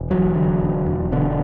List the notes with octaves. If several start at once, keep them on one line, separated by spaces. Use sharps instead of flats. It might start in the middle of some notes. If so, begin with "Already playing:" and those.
Already playing: E1
E2 F#3
D3
E1
E1
B2 D3